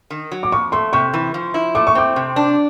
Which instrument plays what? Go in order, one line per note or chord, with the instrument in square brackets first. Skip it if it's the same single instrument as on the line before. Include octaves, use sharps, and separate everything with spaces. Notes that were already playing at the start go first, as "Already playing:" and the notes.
[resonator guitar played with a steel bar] D#3
F#3
[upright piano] D6
[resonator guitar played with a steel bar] F2 [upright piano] C#6
[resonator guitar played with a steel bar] A3 [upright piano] C6
[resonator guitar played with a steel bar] C3 [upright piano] C#6
[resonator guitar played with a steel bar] E3
F3
E4
[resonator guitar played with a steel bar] A3 [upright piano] D6
[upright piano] C#6
[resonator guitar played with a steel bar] C4 [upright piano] D6
[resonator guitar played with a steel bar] C3
D4